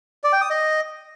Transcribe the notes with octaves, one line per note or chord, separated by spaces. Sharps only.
D5
G5
D#6
D#5